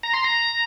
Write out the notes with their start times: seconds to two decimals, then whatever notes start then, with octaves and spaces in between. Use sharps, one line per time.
0.03 A#5
0.14 C6
0.24 A#5